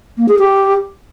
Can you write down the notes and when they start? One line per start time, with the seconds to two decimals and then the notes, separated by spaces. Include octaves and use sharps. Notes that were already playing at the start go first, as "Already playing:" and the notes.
0.18 A#3
0.28 G#4
0.39 G4